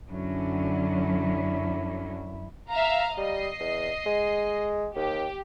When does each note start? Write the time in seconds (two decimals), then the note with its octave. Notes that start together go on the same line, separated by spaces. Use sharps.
0.11 F#2 D3 F#3 C#4 E4
2.72 E5 F5 A#5
3.17 G3 D#5 C7
3.60 E2
4.06 G#3
4.96 D#2 G4